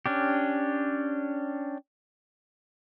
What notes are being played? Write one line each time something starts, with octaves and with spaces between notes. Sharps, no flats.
C#4 D4 G4